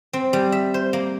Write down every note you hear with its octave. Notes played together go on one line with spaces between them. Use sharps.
C4
G3
E5
C5
A#3